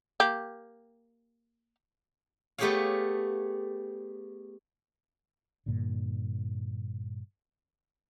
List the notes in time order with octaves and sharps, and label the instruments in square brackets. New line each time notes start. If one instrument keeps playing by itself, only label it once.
[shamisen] A#3 G4
[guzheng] A3 B3 G4 G#4 C#5 F5
[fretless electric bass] G2 A#2 D3